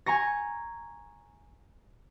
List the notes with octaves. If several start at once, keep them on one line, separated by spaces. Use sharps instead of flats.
G#5 A#5 C#6 A#6